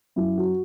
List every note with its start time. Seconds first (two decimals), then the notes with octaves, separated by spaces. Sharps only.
0.16 F#2 F#3 E4
0.37 F#4